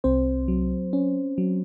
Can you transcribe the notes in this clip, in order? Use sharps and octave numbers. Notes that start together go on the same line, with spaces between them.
C2 C4 C5
F#3
C#4
F#3